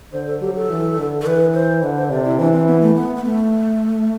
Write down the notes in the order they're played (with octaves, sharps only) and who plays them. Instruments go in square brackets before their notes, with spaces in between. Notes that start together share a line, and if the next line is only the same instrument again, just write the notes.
[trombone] D3 [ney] C5
[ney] A4
[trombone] F#3 [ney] G4
[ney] A4
[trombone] E3
D3
[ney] A4
[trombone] E3 [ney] B4
[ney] C5
[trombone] D3 [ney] B4
[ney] C5
[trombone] C3 [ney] D5
[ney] E4
[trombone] E3 [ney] D4
[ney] C4
B3
A3
B3
B3
A3